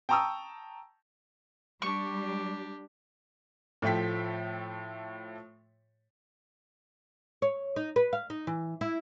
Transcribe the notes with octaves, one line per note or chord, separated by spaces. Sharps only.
G5 A5 A#5 C#6 D#6 E6
G3 D4 G4 C#6
A2 F3 A3 G5 B6
C#5
D#4
B4
F5
D#4
E3
E4